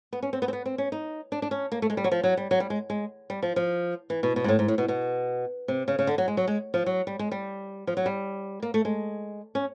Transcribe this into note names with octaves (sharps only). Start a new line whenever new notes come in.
B3
C#4
C4
B3
C4
B3
C4
C#4
D#4
D4
D4
C#4
A#3
A3
G#3
G3
F#3
F3
F#3
G3
F#3
G3
G#3
G#3
G3
F3
F3
E3
B2
B2
G#2
A2
G#2
A2
B2
B2
C3
C#3
C#3
D3
F#3
G#3
F#3
G#3
F3
F#3
G3
G#3
G3
F3
F#3
G3
A#3
A3
G#3
C#4